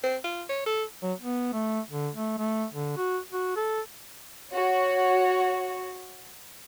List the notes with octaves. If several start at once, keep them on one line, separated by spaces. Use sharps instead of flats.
C4
F4
C#5
A4
F#3
B3
A3
D3
A3
A3
D3
F#4
F#4
A4
F#4 C#5